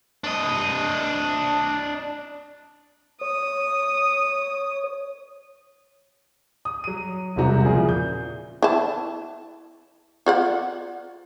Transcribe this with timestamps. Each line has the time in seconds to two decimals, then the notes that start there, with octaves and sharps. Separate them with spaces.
0.24 D4 D#5
3.21 C#5 D#6
6.65 D#6
6.84 F#3 D#7
7.36 E1 C2 C3 C4 F#4 A#5
7.65 A#2 C#3 F3 E4 G#4
7.89 G6
8.63 E4 A5
10.26 F4 D5 F#5